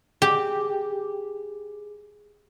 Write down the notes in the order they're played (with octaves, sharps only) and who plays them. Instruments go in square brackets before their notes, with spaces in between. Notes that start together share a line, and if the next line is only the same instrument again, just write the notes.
[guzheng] G4 [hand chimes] G#4